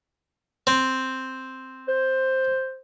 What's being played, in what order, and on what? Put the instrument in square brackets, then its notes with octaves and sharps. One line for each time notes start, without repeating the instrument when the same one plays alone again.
[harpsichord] C4
[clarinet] C5